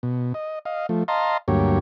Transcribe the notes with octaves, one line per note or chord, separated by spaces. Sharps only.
B2
D#5
D#5 F5
F3 A3
D#5 F5 A5 A#5 C6
D2 G2 F#3 A#3 G4 C#5